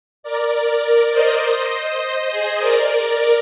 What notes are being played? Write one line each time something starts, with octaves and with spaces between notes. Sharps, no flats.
A#4 D5
A#4 D5
C5 D#5
C5 D#5
C5 D#5
G#4 C5
A#4 D5